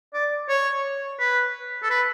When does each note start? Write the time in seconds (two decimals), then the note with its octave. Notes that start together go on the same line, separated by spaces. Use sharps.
0.14 D5
0.49 C#5
1.19 B4
1.83 A4
1.90 B4